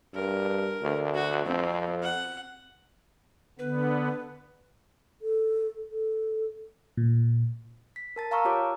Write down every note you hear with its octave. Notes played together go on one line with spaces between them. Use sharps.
G2 A#4
D2
F#4
F2 C4
F#5
D3 B3 B4
A4
A4
A#2
B6
A#4 A5 A6
F5 A5 A#5 C#6 E6 F6
F4 G4 C#5 D6